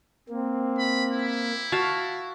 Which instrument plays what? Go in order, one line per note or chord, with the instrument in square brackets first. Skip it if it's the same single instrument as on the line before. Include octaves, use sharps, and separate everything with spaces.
[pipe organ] A#3 [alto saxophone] C4
[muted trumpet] B5
E4
[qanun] F#4 F5 A5